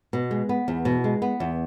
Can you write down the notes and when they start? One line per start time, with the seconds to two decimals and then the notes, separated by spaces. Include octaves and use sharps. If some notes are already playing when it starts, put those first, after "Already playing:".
0.13 B2
0.31 G#3
0.49 B3
0.68 E2
0.85 B2
1.04 G#3
1.22 B3
1.40 E2